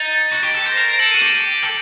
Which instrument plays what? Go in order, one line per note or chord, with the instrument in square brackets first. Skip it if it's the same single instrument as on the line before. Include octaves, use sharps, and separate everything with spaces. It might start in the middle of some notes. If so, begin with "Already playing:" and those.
Already playing: [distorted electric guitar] D#4 [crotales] A6
[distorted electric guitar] F#4
G4
A4
C5
[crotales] A#6
[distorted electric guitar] A#4 [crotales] C7
[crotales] D7
[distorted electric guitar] A4 [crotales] F#7
[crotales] D#7
[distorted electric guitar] F#4
[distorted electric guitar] G4 [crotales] F#7
[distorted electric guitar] A4